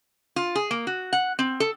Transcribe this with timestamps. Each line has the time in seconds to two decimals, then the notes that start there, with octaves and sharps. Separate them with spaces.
0.36 F4
0.55 G#4
0.71 A#3
0.87 F#4
1.13 F#5
1.39 C4
1.60 A4